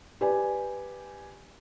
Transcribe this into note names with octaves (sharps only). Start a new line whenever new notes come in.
G4 B4 D5 G#5